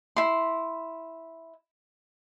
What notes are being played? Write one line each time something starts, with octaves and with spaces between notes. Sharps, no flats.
E4 C6